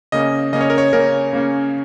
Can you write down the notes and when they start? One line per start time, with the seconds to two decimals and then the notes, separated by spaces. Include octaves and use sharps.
0.12 C#3 A#3 C#4 D#5
0.53 C#3 A#3 C#4 D#5
0.61 C#5
0.70 A#4
0.78 C#5
0.93 C#3 A#3 C#4 A#4
1.33 C#3 A#3 C#4